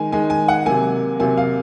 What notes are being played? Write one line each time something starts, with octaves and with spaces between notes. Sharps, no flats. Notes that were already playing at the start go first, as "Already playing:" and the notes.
Already playing: D#3 G#3 G#5
D#3 G#3 G#5
G#5
F#5
C3 F#3 A#3 G#5
C3 F#3 A#3 G#5
F5